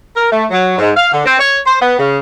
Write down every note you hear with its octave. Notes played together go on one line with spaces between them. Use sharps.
A#4
A3
F#3
G#2
F5
D3
C4
C#5
C5
B3
C#3